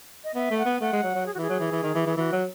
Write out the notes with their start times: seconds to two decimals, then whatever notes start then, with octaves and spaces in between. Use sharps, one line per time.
0.24 D#5
0.35 B3 E5
0.51 A3
0.58 F#5
0.65 B3
0.81 A3 F#5
0.93 G#3
1.03 F#3
1.15 F#3
1.26 G#4
1.34 F#4
1.37 E3 G#4
1.49 F#3
1.60 E3
1.72 E3
1.83 D#3
1.95 E3
2.06 E3
2.17 E3 F#4
2.33 F#3